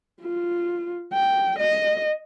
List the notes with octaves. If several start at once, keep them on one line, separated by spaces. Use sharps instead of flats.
F4
G5
D#5